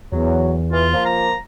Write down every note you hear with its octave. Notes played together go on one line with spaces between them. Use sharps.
E2 F#3
E3 F4
F3 A#3
A#5